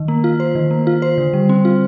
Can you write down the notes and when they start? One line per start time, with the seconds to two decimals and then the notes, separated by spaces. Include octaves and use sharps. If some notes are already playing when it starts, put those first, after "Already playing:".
Already playing: D#3
0.08 A#3
0.24 F4
0.40 C5
0.55 D#3
0.71 A#3
0.87 F4
1.02 C5
1.18 D3
1.33 G3
1.49 C4
1.65 F4